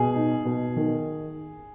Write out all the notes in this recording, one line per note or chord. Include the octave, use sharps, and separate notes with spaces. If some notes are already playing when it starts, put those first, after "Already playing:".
Already playing: B2 G#4
D#4
B2
D#3